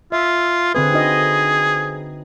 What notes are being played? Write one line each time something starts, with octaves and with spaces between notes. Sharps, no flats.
F4 E5
D3 C4 G#4 B4
D#4 F#4 D#5